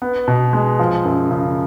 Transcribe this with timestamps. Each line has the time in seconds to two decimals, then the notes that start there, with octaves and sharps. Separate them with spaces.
0.02 B3
0.28 B2
0.53 G#3
0.79 F3
1.05 F#2
1.31 C#3